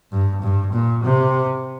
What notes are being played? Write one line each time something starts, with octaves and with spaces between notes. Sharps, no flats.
G2
G2
A#2
C3